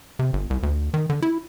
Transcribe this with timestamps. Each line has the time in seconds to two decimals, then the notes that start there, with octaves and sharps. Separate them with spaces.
0.19 C3
0.33 G1
0.50 C2
0.63 D2
0.94 D#3
1.10 D3
1.22 E4